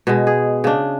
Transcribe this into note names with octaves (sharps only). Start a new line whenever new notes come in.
B2 G#3
G#4
C#3 D4